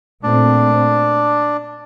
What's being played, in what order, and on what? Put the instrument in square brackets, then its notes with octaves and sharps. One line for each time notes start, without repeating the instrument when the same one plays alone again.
[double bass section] A#2 A3 C4 [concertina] D4